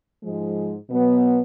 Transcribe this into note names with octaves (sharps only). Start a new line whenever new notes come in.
G#2 F3 G#3
B2 F#3 B3